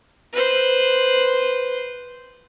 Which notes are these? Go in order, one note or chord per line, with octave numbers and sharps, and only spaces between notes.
B4 C5